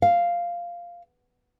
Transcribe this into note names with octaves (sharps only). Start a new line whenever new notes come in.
F5